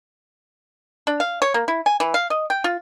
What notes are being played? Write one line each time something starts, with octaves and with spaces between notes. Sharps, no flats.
D4
F5
C#5
A#3
E4
G#5
E3
F5
D#5
G5
F4